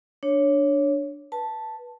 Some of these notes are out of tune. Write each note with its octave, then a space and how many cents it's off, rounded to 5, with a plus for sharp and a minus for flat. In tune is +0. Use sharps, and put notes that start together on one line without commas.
D4 +0 C#5 +0
B4 -15 A5 +0